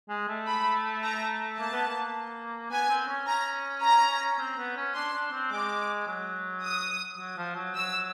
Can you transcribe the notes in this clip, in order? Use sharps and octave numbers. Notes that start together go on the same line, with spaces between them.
G#3
A3
B5
A#5
A#3 A5
B3
A#3
B3 G#5
C4
C#4
C#4 A#5
A#5
C4
B3
C#4
D4 C6
D4
C4
G#3 D6
F#3
D#6
F#3
F3
F#3
F#3 E6